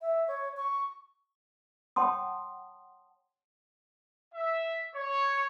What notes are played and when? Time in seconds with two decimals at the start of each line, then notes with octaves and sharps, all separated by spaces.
0.01 E5
0.28 C#5
0.57 C#6
1.96 C#5 F#5 G5 A5 C6 D#6
4.34 E5
4.95 C#5